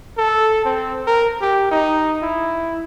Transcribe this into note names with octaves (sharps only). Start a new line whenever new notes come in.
A4
C4
A#4
G4
D#4
E4